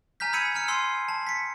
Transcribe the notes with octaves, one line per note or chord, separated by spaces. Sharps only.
G#5 A#5 F6 G6 B6
B5 E6 G#6 B6 C#7 D#7
G#5 A#5 F6 C#7
G#5 C6 E6 C7
A5
B6 C#7